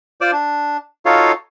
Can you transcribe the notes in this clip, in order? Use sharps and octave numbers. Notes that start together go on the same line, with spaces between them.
F4 C5 D5 D6
D4
D#4 F4 F#4 A4 C#5 F5